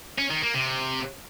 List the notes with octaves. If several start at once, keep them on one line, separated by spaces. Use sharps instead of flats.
C#4
D#3
A#3
C3